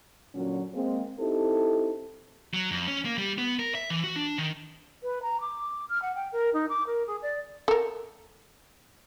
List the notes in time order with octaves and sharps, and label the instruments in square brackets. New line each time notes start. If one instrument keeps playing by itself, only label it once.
[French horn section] A#2 D3 F#3 C#4 F#4
G#3 A#3 C4
C4 D#4 E4 G4 A4
[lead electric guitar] F#3
F2
C#4
A#3
G3
B3
A#4
E5
E3
F#4
D4
D#3
[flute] B4
A#5
D6
F6
F#5
G5
A#4
D#4
D6
A#4
G#4
D5
[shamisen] A4 A#4